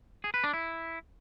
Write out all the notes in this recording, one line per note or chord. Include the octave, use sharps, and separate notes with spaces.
G#4
B4
D4
E4